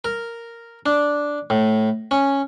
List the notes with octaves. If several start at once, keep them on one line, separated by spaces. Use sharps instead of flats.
A#4
D4
A2
C#4